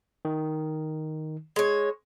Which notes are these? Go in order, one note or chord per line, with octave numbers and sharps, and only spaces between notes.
D#3
G#3 C#5